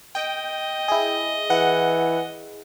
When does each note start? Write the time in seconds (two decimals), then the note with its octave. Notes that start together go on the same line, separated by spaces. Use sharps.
0.15 D#5 G5
0.88 E4 G#4
1.50 E3 F#5